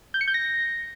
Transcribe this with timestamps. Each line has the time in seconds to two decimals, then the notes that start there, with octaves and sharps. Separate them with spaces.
0.14 G6
0.21 C#7
0.28 G6
0.34 A#6